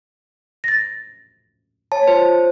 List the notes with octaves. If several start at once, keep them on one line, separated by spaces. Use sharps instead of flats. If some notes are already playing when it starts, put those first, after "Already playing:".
A6 A#6
C#5 A5
F4 C5